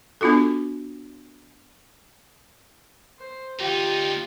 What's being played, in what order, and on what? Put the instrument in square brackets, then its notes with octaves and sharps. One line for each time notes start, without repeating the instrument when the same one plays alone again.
[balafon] B3 D4 F4 F#4 A4
[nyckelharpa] C5
[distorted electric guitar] D2 D#4 [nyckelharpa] F4 [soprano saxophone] G4